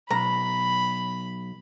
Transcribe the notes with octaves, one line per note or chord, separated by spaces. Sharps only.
B1 A#5 B5